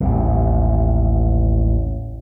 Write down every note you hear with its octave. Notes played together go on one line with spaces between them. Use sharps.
A1 D#2 C3